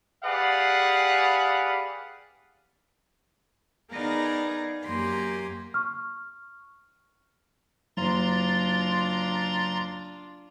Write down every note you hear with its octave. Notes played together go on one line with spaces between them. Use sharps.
G4 G#4 B4 D5 F5 F#5
B3 D#4 G#4 A#4 D5 F5
F#2 A#3 G4 G#5 A#5 C6
C#6 F6
F#1 D4 F4 A#5 C6 A6